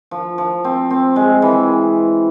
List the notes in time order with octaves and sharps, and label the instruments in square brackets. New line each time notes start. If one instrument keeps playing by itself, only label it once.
[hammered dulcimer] F3
F3
C4
C4
G#3
E3